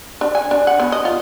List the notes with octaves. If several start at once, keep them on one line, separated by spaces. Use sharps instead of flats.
D4
G#5
D4
F#5
B3
D#5
F4